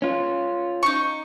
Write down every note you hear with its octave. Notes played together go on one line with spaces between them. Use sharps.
C#4 F4
D#4 C#6